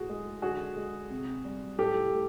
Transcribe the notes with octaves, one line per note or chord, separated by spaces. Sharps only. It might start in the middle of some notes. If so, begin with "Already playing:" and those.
Already playing: A2 F#4 G#4
G#3
D3 F#4 G#4
G#3
C3
G3
A2 G4 A4
A3